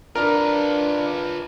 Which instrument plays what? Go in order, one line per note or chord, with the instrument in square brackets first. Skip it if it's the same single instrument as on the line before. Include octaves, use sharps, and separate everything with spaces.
[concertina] D4 [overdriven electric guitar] F4 B4 [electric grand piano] A#4